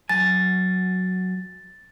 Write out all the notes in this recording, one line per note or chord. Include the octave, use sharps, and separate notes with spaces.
F#3 G#5 A6